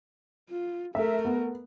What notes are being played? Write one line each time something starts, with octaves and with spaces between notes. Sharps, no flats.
F4
A3 A4 A#4 E5
B3